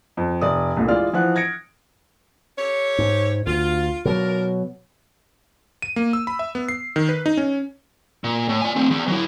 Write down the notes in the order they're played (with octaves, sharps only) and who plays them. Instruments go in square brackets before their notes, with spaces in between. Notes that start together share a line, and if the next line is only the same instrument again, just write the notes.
[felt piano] F2
F1 D5 D#6
C2 G2 A#2 A3
E3 G#3 F4 D5 F6
E3 F3 F#5 F#6
G#6 A#6 C#7 D7
[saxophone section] G4 A4 C#5
[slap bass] G#2
[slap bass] D2 [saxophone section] F4
[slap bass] B2 F#3 [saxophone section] D4 F4 A#4
[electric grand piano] D#7
A#3
E6
B5
E5
B3
C7
D#3
B4
D#4
C#4
[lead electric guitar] A#2
A2
D5 G#5
A3 C4
E2
F#3 E4